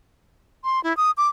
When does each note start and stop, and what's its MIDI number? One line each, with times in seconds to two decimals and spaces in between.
0.64 0.82 84
0.84 0.95 64
0.97 1.11 87
1.17 1.29 86